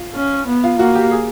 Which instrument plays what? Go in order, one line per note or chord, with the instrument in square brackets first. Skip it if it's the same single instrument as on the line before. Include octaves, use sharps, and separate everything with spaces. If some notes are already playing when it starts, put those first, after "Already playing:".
Already playing: [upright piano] F4
[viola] C#4
B3
[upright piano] F4
[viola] A#3 [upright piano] F#4
[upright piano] G4
G#4